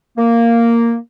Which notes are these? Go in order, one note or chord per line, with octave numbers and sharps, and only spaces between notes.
A#3